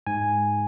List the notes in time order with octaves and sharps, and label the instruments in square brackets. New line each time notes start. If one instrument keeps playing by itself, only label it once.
[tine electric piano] G#2 G#5